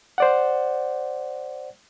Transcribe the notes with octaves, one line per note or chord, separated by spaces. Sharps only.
C5 D5 F#5